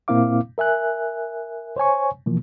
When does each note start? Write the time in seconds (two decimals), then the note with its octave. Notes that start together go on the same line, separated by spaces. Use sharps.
0.08 A#2 A#3 C4 E4 F5 D6
0.58 A#4 E5 G#5 F#6
1.76 C5 C#5 G#5 C#6
2.26 B2 E3 F3 A#3